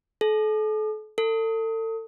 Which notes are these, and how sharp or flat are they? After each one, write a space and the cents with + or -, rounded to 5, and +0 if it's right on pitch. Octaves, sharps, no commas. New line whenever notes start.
A4 -40
A4 +35